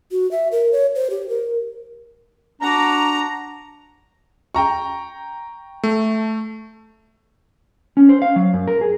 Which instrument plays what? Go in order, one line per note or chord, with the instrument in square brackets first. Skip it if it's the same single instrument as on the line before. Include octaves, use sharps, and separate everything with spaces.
[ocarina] F#4
E5
A#4
C#5
C5
G4
A#4
[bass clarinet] D4 [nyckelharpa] F#4 D6 [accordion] A#5
[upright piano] G5 A#5 C#6
[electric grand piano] A3
[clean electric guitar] C#4
C5
F5
F#3
F#2
A#4
G#4